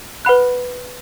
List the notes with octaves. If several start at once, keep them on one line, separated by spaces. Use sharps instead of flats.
B4 F#5 B5 F#6